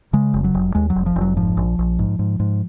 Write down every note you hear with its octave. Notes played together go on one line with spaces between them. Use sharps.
C#3 G#3
F1
F#3
F1
D#2 G#3
F#3
F1
F3
F1
F#3
G#2 F3
A#1
A#1
G#2
G#2
G#2